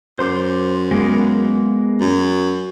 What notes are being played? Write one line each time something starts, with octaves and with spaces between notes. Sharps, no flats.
F#2 C5 C6 D6
G#3 A#3 B3
F#2